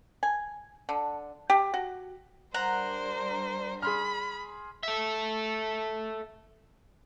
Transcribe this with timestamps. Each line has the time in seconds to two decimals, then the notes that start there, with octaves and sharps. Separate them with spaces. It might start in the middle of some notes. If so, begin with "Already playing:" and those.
0.23 G#5
0.89 D3
1.50 G4
1.74 F#4
2.54 G3 D4 A#4 C5 F#5 A#5
3.82 G#4 B5 C6 F6
4.83 A4 E5